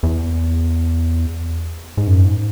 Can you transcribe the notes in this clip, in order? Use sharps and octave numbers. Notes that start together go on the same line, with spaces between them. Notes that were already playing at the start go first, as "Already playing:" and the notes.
E2
G#2
F#2
G#2